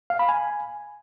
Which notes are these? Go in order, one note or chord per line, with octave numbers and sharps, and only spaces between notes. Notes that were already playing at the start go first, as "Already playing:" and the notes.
F5
B5
G#5